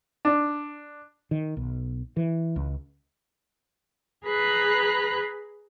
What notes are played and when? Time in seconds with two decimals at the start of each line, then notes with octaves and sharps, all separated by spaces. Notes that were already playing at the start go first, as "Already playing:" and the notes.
0.25 D4
1.31 D#3
1.57 B1
2.17 E3
2.56 C#2
4.25 G#4 B4 A#5 B5 F#6